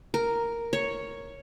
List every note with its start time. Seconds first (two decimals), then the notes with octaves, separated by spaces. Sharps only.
0.14 A#4
0.73 C#5